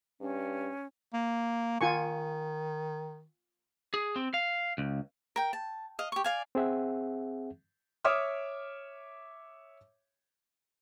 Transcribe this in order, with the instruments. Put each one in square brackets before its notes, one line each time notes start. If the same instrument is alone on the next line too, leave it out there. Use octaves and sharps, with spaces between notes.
[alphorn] G2 [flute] C#4
[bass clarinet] A#3
[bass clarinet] D#3 [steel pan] F4 G#5 C#6
[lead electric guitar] G#4
C4
F5
C#2
[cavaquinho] A#4 G5
A5
D#5 F5
G4 C#6
D5 F5 G#5
[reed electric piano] C4 G#4 E5 F#5
[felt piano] C#5 E5 D6 D#6 F6